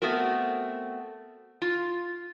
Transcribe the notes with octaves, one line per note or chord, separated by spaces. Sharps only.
A3 B3 C4 F#4 A#4
F4